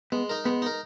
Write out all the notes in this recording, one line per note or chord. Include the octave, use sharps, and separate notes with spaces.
G#3 B3
D#4 A#4
G#3 B3
D#4 A#4